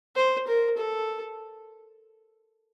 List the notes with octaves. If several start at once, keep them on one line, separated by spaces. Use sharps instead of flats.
C5
A#4
A4